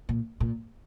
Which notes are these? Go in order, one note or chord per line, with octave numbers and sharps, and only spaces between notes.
A#2
A#2